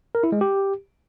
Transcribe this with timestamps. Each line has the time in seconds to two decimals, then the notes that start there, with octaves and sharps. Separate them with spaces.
0.15 A#4
0.23 E4
0.32 G#3
0.41 G4